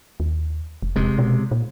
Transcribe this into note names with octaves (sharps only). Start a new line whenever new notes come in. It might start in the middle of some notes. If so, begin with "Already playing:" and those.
D#2
F1
E1 C3 G#3
B2
A#2